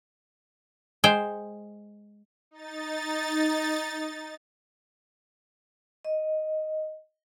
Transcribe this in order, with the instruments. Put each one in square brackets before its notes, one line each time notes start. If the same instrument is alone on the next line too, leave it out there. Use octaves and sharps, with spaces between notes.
[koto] G#3 C5 G5
[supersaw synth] D#4 A6
[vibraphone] D#5